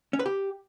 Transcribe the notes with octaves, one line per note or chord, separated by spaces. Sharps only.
C#4
B4
G4